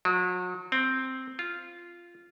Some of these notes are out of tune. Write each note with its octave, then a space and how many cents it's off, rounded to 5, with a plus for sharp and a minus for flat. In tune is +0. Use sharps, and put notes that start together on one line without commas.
F#3 -35
C4 +0
F4 -10